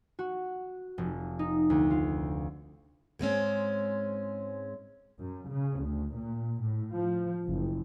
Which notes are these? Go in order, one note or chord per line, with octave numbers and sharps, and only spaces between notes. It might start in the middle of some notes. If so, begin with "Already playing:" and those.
F#4
F1
D#4
D2
F4
G#2 G#3 C4 C#4
F#2
C#3
D2
A#2
A2
F3
F#1